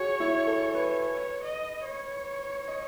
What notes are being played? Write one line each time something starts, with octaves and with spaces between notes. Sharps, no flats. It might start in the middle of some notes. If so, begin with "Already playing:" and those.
Already playing: F#4 G#4 C#5
E4
A4
B4
C#5
D#5
C#5
D#5